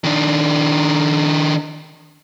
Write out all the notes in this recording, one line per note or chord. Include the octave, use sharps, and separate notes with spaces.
D#3 D4